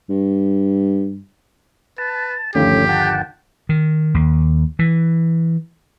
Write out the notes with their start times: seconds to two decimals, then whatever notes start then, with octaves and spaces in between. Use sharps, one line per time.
0.10 G2
1.98 B4 A5
2.55 G1 D#2 F3 A3 C#4 G4
2.89 F#5 G5 A5
3.69 D#3
4.14 D#2
4.79 E3